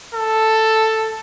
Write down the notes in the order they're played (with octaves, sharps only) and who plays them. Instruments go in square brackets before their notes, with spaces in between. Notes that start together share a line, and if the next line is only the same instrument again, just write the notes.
[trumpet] A4